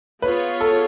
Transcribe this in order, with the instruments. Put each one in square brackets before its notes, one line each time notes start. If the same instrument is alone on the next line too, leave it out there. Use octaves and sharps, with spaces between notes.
[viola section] B3 F4 G#4 C#5 [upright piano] B4
[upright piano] A4